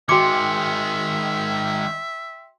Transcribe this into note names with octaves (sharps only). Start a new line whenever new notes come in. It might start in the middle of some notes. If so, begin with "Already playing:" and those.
D#3 G#3 F#4 E5 G5 C6 D6 C#7